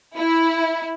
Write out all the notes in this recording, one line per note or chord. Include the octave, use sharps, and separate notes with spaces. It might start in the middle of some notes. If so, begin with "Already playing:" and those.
E4